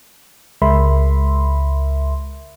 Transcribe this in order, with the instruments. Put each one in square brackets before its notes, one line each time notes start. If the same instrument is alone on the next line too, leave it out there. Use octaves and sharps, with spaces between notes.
[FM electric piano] C#2 G#3 A#4 E5 B5 C6